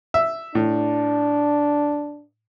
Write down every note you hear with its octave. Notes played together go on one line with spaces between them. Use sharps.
E5
A2 D4